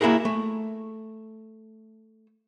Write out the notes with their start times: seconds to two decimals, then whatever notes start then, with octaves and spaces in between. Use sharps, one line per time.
0.01 A#3 E4 F#4 G#4 A#4
0.25 A3